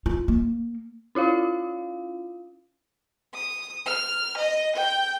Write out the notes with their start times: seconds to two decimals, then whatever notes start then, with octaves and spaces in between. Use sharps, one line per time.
0.06 F4
0.28 A#3
1.15 C#4 E4 F4 F5
3.34 D#6
3.86 F6
4.38 D#5
4.76 G5